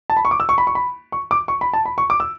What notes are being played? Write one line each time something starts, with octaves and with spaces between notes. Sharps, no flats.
A5
B5
C#6
D6
E6
C#6
B5
C#6
B5
C#6
D6
C#6
B5
A5
B5
C#6
D6
E6